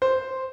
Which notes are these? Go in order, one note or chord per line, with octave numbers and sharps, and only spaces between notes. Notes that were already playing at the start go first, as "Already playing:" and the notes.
C5